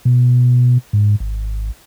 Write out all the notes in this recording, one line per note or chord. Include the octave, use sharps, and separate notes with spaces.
B2
G#2
G#1